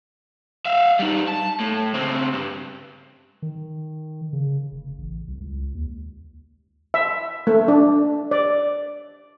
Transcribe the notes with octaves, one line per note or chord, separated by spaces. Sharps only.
E5 F5
G3 D#4
A5
A2
C#3 C4
G2
D#3
C#3
F1
A1
C2
C#2
D#2
E5
A3
D4
D5